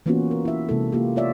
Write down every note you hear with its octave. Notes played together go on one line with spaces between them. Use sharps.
E3 A#3 B3 C#4 F4 F#4
A#4
E4 E5
C3 G#3 A#3 E4 A4
A#3 F4 G4
B3 F4 C#5 D5 E5